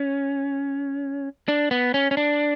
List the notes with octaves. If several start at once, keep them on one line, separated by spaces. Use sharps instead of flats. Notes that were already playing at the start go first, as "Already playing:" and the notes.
Already playing: C#4
D4
B3
C#4
C#4
D4